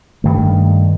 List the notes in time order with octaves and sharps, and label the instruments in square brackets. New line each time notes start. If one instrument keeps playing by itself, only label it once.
[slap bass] G2 D#3 A3